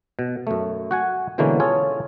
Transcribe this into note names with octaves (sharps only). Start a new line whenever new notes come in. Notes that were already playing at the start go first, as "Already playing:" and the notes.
B2
F#2 A3
F#4 F#5 G#5
B2 D3 E3 G#3 A#3 C#4
C#4 F4 G#4 A4 C#5